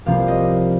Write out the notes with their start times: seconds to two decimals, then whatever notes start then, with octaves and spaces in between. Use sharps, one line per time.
0.06 C2 C3 F3 A#3 F5
0.28 D#5